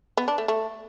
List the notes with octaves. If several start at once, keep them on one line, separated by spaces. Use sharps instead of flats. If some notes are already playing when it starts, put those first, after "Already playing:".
B3
D4
A3
A3